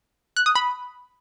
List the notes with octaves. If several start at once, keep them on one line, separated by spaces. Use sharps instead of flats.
F#6
D#6
B5